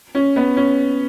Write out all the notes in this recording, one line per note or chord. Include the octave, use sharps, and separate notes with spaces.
C#4
B3
C#4